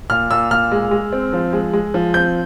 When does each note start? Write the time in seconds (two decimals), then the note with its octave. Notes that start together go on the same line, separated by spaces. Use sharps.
0.10 A#2 F6
0.31 A#2 E6
0.51 A#2 F6
0.72 G#3
0.91 G#3
1.12 C4
1.33 F3
1.53 G#3
1.73 G#3
1.94 F3
2.14 C4 G6